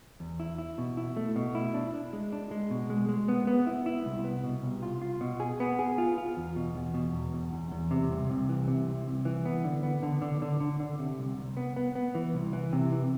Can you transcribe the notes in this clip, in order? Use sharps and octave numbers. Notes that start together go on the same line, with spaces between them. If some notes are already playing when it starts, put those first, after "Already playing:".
E2
E4
E4
B2
E4
A3
B2
E4
D4
D4
G#3
D4
G#3
B2
G#3
G#3
B3
B3
E4
E4
C2
B3
B2
C2
F4
F4
B2
G#4
B3
G#4
F4
F4
E2
B2
E2
B2
E2
E2
E2
E2
C3
C2
C2
E3
C3
C2
C2
E3
B3
D3
B3
D3
D3
D3
D3
D3
C3
C2
C2
B3
B3
B3
E3
C2
E3
C3
E3